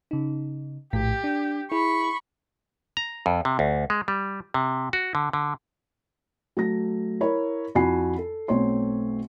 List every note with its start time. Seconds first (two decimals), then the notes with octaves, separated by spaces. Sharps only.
0.11 C#3 D#4
0.93 A#1 A2 G4 B6
1.24 D4
1.72 E4 G#4 B5 C#6
2.97 A#5
3.26 F2
3.45 C3
3.59 D2
3.90 G#3
4.08 G3
4.54 C3
4.93 F#4
5.15 D3
5.33 D3
6.57 F#3 A3 A#6
7.21 E4 A#4 C#5 B5
7.75 F2 E4 F#4 G#5 B5 C7
8.17 A4
8.48 B1 A3 C4 C#5 C6